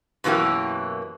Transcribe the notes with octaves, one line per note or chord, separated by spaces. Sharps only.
F#2 B2 E3 A#3 G4